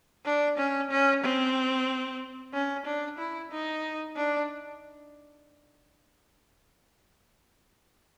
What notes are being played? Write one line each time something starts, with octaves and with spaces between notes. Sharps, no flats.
D4
C#4
C#4
C4
C#4
D4
E4
D#4
D4